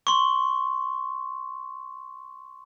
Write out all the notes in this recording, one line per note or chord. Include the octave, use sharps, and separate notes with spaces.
C6 C#6